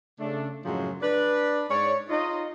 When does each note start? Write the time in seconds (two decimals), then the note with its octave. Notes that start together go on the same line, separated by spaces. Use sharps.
0.19 C#3 A3 D4
0.65 F#2 A2 C#3 F3 F#3 G#3
1.02 D4 B4 D5
1.69 G#2 C#5 D5
2.09 D#4 F4 D#5